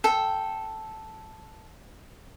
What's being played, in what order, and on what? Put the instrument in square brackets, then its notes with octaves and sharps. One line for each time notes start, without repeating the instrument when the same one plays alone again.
[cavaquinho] A4 G5